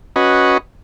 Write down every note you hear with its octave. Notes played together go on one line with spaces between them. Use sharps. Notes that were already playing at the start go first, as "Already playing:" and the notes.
C#4 F#4 B4 D#5